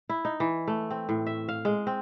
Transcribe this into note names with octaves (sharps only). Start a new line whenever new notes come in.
E4
D#4
E3
A3
C4
A2
E5
F5
G#3
C4